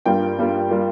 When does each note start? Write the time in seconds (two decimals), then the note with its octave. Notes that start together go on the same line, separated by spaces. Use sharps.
0.06 G2 G3 A#3 F4 G5
0.38 G2 G3 A#3 F4
0.71 G3 A#3 F4